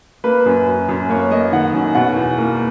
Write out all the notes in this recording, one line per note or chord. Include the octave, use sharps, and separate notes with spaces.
A#3 B4
F#2
F#2
F#2
A#3 C#5
A#3 D#5
D#3 F#5
F#2
B2 F#5
E2
A#3